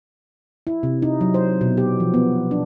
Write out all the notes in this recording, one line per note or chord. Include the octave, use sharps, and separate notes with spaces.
E4
C3
D#4
F#3
C5
B2
G4
F3
B3
D4